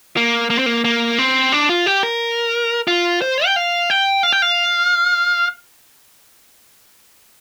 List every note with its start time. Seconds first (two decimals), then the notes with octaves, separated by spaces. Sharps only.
0.17 A#3
0.50 A#3
0.59 C4
0.66 A#3
0.84 A#3
1.18 C4
1.52 D4
1.69 F4
1.86 G4
2.03 A#4
2.88 F4
3.22 C5
3.45 G5
3.56 F5
3.90 G5
4.23 F5
4.33 G5
4.42 F5